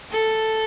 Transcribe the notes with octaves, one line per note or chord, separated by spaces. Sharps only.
A4